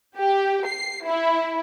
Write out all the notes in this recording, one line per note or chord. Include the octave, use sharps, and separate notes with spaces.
G4
C7
E4